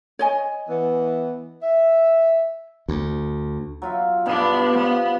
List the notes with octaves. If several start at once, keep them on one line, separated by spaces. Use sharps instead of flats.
C#5 D#5 G#5
E3 B3
E5
D2
F#3 F4 E5
G2 B2 B3 D4 E4
F3 G3 B3 F4